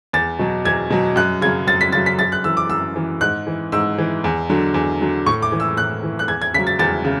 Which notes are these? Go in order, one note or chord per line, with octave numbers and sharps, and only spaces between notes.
E2 A6
B2 F#3
E2 G#6
B2 F#3
F#2 F#6
C#3 F#3 G#6
F#2 A6
B6
C#3 F#3 A6
B6
F#2 A6
F#6
E3 E6
D6
F#2 E6
E3
G#2 F#6
E3
G#2 E6
E3
E2
D3 F#3
E2
D3 F#3
A2 C#6
D6
E3
E6
A2 F#6
E3
F#6
E2 G#6
G#6
C#3 F#3 B6
A6
E2 A6
C#3